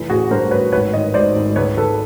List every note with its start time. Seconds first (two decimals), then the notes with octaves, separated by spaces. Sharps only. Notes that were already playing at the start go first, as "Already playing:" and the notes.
Already playing: F1 E3
0.10 A1 F#4 G#4
0.31 G2 A#4 C5
0.51 A1 B4 C#5
0.72 G#1 B4 C#5
0.93 D#3 C#5 D#5
1.14 G#1 C5 D5
1.36 G#1
1.56 C#2 B4 C#5
1.77 C#2 A4 B4